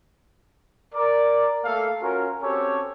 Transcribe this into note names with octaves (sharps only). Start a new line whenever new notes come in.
A#4 D5
A3 A#3 A4 F5
C#4 F4 F#4 A#4
C4 C#4 F#4 G4 A4 C#5